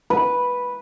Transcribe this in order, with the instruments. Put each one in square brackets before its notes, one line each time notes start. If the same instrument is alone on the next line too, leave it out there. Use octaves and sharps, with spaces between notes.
[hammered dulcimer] B4